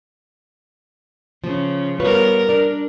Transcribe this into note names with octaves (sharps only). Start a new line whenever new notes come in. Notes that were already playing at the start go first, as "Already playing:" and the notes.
C#3 F3
G3 B3 F4 A#4 B4 C#5
D4 A#4 D5